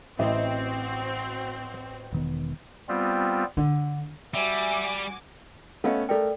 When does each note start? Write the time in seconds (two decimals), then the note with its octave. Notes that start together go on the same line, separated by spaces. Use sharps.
0.19 A1 C4 F#4 D#5 E5
2.13 E1 D#3 B3
2.89 G3 B3 C4 F4
3.57 D3
4.34 G3 F#4 E5 G#5 D6
5.84 A3 B3 C#4 D#5 F5 F#5
6.09 A3 A4 A#4 D5 G5